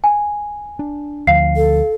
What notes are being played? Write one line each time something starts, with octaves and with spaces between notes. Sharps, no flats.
G#5
D4
D2 F3 F5 C7
A4